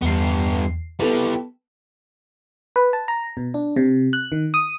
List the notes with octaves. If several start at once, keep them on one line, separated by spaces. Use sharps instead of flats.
E2 G2 B3 C7
G3 B3 E4 A4 B4
B4
A5
A#5
B2
D4
C3
F#6
D#3
D#6